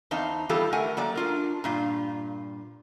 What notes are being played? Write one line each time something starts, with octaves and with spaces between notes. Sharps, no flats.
E2 C4 D#4 F5 A5
E3 G3 B3 F4 G4 A4
A3 A#4 F#5 G#5
F#3 A#3 D5
D4 F4 A#4
G2 A#2 F4